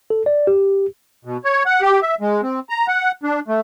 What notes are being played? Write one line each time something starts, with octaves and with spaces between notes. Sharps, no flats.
A4
D5
G4
B2
C#5
F#5
G4
E5
G#3
C4
A#5
F#5
D4
A3